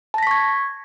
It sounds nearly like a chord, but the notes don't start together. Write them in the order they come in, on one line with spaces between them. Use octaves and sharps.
A5 A#6 B6 C#6 G#6